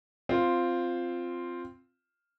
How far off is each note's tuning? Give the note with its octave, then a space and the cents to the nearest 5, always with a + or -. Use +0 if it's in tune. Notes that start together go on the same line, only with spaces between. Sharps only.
C4 +0 F4 +0